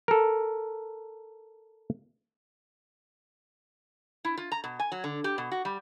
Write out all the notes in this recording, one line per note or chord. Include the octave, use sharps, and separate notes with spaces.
A4 A#4
E4
F4
A#5
B2
G#5
F#3
D3
G4
B2
F#4
G3